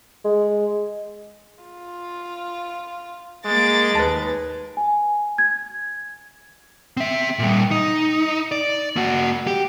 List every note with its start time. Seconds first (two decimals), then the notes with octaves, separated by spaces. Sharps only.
0.24 G#3
1.63 F4
3.45 G#3 A#3 D6 A6
3.95 D#2 B4 A5
4.77 G#5
5.38 G#6
6.97 C4 E5
7.39 A#2 G3
7.71 D#4
8.52 D5
8.96 A#3 F#4
9.47 G4